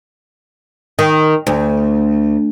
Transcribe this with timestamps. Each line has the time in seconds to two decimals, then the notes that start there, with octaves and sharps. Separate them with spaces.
0.99 D#3
1.47 D2